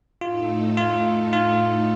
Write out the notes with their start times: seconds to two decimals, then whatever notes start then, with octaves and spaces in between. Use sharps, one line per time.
0.21 A2 A3 D#4 F4 A4
0.77 F4
1.33 F4